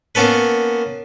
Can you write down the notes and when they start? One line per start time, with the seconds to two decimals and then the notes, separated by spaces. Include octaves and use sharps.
0.15 A#3 B3 C#4 A4 B4